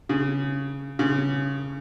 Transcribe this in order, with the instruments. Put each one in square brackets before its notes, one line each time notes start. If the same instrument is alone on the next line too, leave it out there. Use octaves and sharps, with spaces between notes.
[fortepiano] C#3
C#3